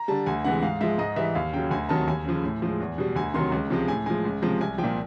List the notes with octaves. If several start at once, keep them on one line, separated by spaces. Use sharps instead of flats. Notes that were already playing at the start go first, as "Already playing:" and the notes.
Already playing: A#5
D3 G3 A5
D2 G#5
C3 E3 G#3 F#5
G#2 F5
F3 G#3 E5
G#2 D#5
E3 G3 E5
D#2 F5
C#3 F#3 G5
D2 G#5
C3 D#3 F#3 A5
D#2 G#5
C#3 F3
A2
F3 G#3
E2
B2 G3
D2 G#5
C3 D#3 F#3 C6
C#2
C3 F3 G#3
A2 G#5
F3 G#3 G#5
C#2
C3 F3 G#3
C2 G#5
F3 G5
A#2